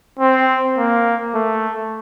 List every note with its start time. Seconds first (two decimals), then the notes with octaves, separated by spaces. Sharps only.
0.19 C4
0.77 A#3
1.35 A3